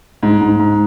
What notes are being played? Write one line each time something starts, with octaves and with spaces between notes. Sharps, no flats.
G#2
G#2
G#2